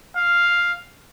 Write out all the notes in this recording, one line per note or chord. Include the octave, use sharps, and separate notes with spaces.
F5